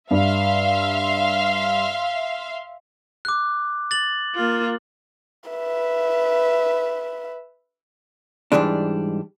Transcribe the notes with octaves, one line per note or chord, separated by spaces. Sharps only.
G2 E5 F5 C6
D6 F#6
A6 F#7
A#3 F4
B4 E5
G#2 B2 E3 G3 G#3 D4